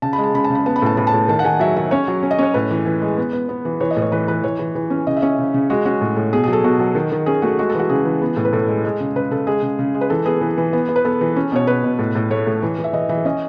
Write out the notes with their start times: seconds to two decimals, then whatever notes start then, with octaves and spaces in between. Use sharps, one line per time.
0.02 C#3 A5
0.13 B5
0.18 G#3
0.23 A5
0.34 C#3 B5
0.44 A5
0.50 C#3
0.55 B5
0.66 B3 A5
0.76 B5
0.82 A2 A5
0.97 A2 B5
1.07 A5
1.14 A2
1.28 D#3 A5
1.39 F#5
1.44 D#3 G#5
1.60 F#3 E5
1.76 D#3 E5
1.91 C#4 C#5
2.08 F#3
2.23 C#4
2.31 D#5
2.39 C#4 C#5
2.54 A2 B4
2.71 E3
2.86 E3
3.02 G#3
3.18 B3
3.33 B3
3.49 B3
3.65 E3
3.81 E3 C#5
3.91 D#5
3.96 A2
4.02 C#5
4.12 E3 B4
4.28 E3 B4
4.43 E3 C#5
4.59 E3
4.75 E3
4.90 C#4
5.07 C#3 D#5
5.17 E5
5.22 C#4 D#5
5.39 C#3
5.54 C#3
5.70 G#3 F#4
5.85 C#4 F#4
6.01 A2
6.17 A2
6.33 B2 G#4
6.44 F#3 G#4
6.53 A4
6.64 B2 F#4
6.80 F#3
6.95 D#3
7.12 D#3
7.26 C#4 G#4
7.42 A3 F#4
7.59 G#3 F#4
7.69 A4
7.75 E3 F#4
7.89 C#3 G#4
8.05 E3
8.22 B3
8.37 A2
8.45 B4
8.53 A2 A4
8.68 G#3
8.84 G#3
9.00 C#3
9.16 C#3 B4
9.31 C#3 A4
9.47 G#3 G#4
9.62 C#3
9.79 C#3
9.95 G#3
10.01 B4
10.10 E3 A4
10.26 B3 G#4
10.41 E3
10.58 E3
10.73 B3
10.89 B3
10.96 B4
11.05 B3 A4
11.21 E3
11.36 C#4
11.52 B2 C#5
11.67 B2 B4
11.84 B2
11.99 A2
12.15 A2
12.30 A3 C#5
12.47 A2
12.62 E3
12.78 E3
12.84 E5
12.93 E3 D#5
13.09 E3 E5
13.25 C#4 D#5